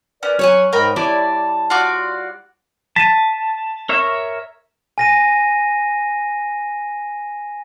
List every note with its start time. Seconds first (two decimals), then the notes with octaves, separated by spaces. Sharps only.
0.23 C#4 A#4 B4 D5
0.39 F#3 C#5 F#5 G#5
0.73 G#2 G#3 A#4 D#5 G5 B5
0.96 G3 E4 D5 A5
1.70 F4 F#4 D5
2.96 A5 B6 D#7
3.89 A#4 C#5 E5
4.98 G#5 A#6 D#7